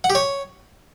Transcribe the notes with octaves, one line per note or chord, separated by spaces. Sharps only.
F#5
G4
C#5